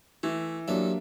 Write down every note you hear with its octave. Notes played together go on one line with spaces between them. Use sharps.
E3 A3
G2 F#3 A#3 D4 A4 E5